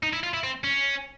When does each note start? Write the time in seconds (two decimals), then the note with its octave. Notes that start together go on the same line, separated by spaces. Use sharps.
0.03 D#4
0.13 E4
0.23 F4
0.34 E4
0.44 C4
0.64 C#4